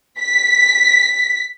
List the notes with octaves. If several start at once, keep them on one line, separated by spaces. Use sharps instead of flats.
B6